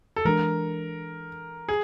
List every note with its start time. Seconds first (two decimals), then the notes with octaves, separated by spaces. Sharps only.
0.16 A4
0.25 E3 G#3 B3 D4 A#4
1.69 G#4